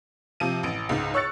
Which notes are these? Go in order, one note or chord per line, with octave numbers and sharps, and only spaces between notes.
C3 F3 D#7
A1 D7
C#2 G#2
C#5 C#6 E6 F#6 A6 C#7